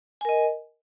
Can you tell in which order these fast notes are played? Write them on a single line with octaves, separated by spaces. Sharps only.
G#5 A#4 D#5